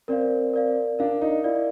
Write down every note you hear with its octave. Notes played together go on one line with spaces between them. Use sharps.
C4 A#4 D5 F5
A#4 D5 F5
D4 A#4 D5 F5
D#4
E4 A#4 D5 F5